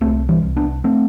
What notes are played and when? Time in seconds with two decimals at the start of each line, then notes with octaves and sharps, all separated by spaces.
0.01 C2 A3 C4
0.29 E3 G3
0.42 C2
0.57 B3 D4
0.84 A3 C4